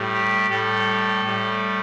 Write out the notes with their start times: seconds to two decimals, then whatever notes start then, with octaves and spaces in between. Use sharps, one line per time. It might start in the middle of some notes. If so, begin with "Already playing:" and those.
Already playing: A2 G3
0.14 G4
0.50 A2 G3 A4
1.25 A2 G3